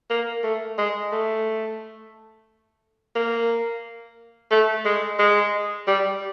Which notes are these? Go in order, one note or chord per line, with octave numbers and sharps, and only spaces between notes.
A#3
A3
G#3
A3
A#3
A3
G#3
G#3
G3